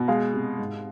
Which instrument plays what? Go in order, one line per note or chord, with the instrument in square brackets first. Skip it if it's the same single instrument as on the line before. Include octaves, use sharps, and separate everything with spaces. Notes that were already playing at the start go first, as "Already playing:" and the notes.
Already playing: [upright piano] B2
G#3 F5
C3
G#2